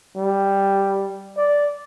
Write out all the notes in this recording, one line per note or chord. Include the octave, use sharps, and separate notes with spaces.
G3
D5